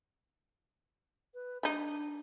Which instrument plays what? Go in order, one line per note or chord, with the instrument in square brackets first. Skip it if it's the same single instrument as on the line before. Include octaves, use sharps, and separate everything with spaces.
[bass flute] B4
[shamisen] G3 D#4 [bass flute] D4